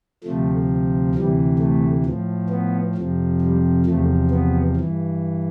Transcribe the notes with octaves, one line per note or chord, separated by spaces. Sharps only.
D2 C3 F3 A3
D2 C3 E3 G3
A3
A2 F3
B3
F2 C3 F3
G3
E2 C3 F3 A3
B3
G2 E3